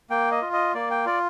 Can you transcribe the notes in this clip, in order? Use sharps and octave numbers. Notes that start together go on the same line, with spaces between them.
A#3 G5
D#5
F4
D#5
A#3 D5
G5
F4 D5